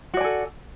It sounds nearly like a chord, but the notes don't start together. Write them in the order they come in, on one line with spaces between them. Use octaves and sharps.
F#4 D5 G#5 A4